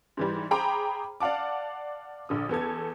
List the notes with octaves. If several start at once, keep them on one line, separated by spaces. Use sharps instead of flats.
G#2 E3 G3
G#4 C5 G5 A#5 B5 D6
D5 F5 F#5 A5 D6
A#1 D3 D#6
E2 B3 A4 G#6